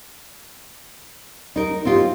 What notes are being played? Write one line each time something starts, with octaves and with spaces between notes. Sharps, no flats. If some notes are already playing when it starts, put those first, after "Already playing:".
D#4 A#4
C4 D#4 F4 G4